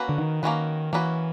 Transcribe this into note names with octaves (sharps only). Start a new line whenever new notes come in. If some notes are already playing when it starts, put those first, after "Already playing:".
Already playing: A#3 C#4 F#4 B4
D3
D#3
D#3 A#3 C#4 F#4 B4
E3 A#3 C#4 F#4 B4